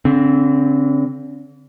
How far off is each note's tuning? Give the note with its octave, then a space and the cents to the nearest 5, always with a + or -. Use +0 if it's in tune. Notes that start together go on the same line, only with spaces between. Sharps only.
D3 -40 C4 +5